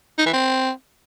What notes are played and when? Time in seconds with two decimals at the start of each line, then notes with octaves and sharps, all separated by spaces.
0.19 D#4
0.26 E3
0.33 C4